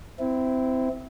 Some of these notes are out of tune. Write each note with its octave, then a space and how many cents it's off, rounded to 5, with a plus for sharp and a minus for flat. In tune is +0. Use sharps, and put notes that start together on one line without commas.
C4 -20 E4 +0